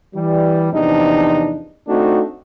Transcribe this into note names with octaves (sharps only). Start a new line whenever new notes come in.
E3 G3
E2 C3 F3 D4 D#4
A3 C4 D4 D#4 F#4